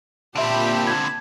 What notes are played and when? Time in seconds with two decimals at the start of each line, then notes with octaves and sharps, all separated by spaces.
0.36 A#2 D3 C4 G4 E5 A5 B5 D7
0.87 G#6